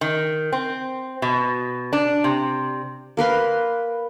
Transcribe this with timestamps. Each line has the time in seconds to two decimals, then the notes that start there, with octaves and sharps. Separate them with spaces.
0.01 D#3
0.52 C4
1.22 B2
1.93 D4
2.24 C3
3.17 A#3 A#4 B4 C6